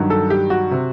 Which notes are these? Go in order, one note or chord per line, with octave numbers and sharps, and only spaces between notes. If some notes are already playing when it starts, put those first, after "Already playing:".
Already playing: G2 D#3 F#3
A4
G4
F#4
C3